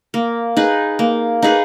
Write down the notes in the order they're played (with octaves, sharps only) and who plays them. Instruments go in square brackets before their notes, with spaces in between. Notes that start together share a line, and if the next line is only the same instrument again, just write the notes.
[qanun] A#3
D#4 G#4 B4
A#3
D#4 G#4 B4